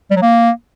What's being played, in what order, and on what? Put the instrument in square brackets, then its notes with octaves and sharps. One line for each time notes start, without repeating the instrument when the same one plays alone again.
[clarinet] G3
F#3
A#3